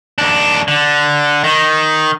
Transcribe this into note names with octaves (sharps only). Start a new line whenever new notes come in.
D#2 D4
D3
D#3